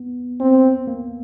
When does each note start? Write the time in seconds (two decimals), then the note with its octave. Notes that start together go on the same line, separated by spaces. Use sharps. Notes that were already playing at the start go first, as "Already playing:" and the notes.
Already playing: B3
0.40 C4
0.87 A#3